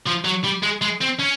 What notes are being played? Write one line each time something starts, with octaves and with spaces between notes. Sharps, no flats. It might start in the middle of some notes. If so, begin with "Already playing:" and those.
F3
F#3
G3
G#3
G#3
C4
C#4